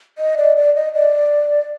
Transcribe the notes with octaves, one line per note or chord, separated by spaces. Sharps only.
D#5
D5
D5
D#5
D5